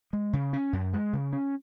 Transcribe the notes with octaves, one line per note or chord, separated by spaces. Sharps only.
G#3
C#3
C#4
F#2
G#3
C#3
C#4